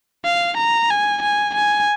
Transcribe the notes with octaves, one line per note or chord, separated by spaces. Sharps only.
F5
A#5
G#5
G#5
G#5